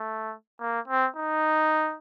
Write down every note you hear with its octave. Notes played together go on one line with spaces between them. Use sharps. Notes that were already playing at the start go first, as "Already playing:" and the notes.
Already playing: A3
A#3
C4
D#4